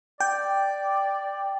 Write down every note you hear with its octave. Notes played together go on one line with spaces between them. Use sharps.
D5 G5